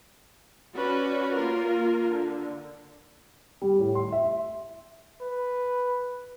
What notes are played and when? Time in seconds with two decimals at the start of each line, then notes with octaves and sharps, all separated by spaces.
0.75 C#4 F#4 B4 D5
1.33 A#3 F4 A#4
2.08 D3
3.62 G3
3.79 A2
3.95 C6
4.12 E5
5.21 B4